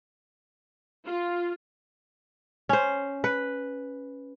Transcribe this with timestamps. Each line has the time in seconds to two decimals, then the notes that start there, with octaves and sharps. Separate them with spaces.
1.06 F4
2.69 C#4 C5
3.24 B4